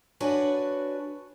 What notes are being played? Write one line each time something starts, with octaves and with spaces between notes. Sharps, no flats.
D4 F#4 B4 C#5 D5 G#5